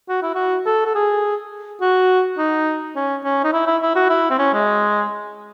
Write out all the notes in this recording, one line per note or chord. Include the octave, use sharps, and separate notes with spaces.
F#4
E4
F#4
A4
A4
G#4
F#4
D#4
C#4
C#4
D#4
E4
E4
E4
F#4
E4
C4
C#4
G#3